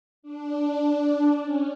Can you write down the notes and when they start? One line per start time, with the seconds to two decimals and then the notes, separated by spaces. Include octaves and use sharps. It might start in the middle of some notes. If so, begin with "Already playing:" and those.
0.23 D4
0.89 D4
1.41 C#4